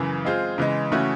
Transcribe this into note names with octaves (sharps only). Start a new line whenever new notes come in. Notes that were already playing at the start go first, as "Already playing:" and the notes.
Already playing: F#2 C#3 E3
G#3 C4 F4 G#4 C5
C#3 E3 G#3
C#3 E3 A3 C#4 F#4